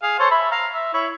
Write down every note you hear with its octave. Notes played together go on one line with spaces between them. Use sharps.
G#4 F5
A4 C5 C#5
E5 B5
F5 A#5
E5
E4 C#5